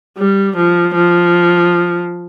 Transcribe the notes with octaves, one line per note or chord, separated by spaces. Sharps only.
G3
F3
F3